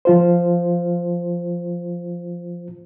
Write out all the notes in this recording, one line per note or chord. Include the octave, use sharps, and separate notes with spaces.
F3 F4 C5